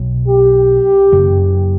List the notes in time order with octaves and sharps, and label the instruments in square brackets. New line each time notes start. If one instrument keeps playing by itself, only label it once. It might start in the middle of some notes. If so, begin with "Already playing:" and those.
Already playing: [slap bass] B1 B2 F#3
[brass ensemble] G4
[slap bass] F#2 C#3 F#3 A#3